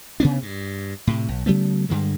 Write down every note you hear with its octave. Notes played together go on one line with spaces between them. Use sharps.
C3 B3 C#4 D4
G2
A2 C3
B1
C#3 F#3 A3 B3
G2 D3 G3 G#3